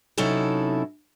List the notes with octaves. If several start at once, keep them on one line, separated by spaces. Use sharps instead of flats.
C3 F#3 C#4 D#4 E4 A4